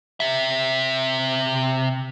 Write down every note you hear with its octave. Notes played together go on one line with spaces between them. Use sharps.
C3 E5